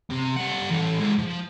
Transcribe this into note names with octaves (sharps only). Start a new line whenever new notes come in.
C3
G3 F#5
E3 A4
G#3 E4
F3